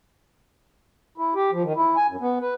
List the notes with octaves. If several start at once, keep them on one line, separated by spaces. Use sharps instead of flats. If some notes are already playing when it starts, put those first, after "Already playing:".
E4
G4
F3
D#3
E4
G#5
F#2
B3
B4